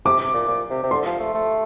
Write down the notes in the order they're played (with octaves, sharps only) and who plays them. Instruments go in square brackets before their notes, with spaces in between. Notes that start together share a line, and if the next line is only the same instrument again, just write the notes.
[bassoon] C3 [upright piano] D6
[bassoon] C3
A#2
A#2
C3
C3
[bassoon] D3 [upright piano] C6
[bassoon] F3
A3
A3